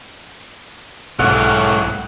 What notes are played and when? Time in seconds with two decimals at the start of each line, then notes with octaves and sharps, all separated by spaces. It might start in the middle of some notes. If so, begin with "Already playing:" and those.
1.19 B1 G#2 A3 E4 C#5 F#5 F6